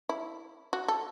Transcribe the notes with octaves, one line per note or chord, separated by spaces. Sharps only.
E4
F#4
A4